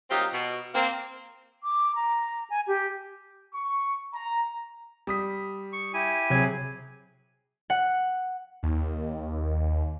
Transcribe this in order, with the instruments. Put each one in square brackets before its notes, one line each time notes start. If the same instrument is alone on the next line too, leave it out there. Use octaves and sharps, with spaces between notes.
[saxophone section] F#3 A#3 C4 D#4 F4 G4
B2
A#3 C4
[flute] D6
A#5
G#5
G4
[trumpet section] C#6
A#5
[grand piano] G3 D#6 B6
[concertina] C#6
E4 G4 G#5
[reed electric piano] C3 G#6 [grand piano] F#3 G#4
[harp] F#5
[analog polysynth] D#2